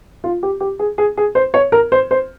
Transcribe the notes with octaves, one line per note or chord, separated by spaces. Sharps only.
F4
G4
G4
G#4
G#4
G#4
C5
C#5
A#4
C5
C5